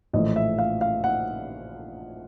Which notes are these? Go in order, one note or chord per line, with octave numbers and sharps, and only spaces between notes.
A#1 A2 E3 D#5
E5
F5
F5
F#5